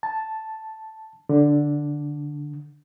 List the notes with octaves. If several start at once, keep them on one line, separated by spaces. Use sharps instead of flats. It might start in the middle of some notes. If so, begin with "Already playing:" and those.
A5
D3